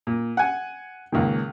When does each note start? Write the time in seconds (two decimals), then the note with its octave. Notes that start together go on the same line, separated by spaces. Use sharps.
0.07 A#2
0.37 F#5 G#5
1.12 C#2 A#2 D#3